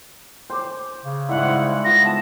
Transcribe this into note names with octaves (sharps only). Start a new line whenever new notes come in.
C5 G5 D6
C#3
G#2 G3 E4 F#5
C5
B3 F4 A#6
B3 A5